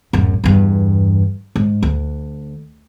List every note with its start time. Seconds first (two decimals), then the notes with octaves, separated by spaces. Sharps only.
0.13 D1 F#2
0.44 E2 G2
1.56 G#2
1.82 D2